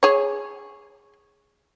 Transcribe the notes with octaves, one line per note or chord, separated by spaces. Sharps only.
G#4 C#5